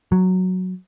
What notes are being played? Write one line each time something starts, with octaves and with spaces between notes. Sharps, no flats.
F#3